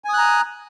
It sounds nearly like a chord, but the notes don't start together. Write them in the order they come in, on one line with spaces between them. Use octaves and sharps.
G#5 D#6 F#6 A#5